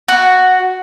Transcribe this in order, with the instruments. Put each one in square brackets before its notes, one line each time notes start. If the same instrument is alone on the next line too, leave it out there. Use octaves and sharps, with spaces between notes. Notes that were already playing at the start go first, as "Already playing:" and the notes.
[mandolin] F#4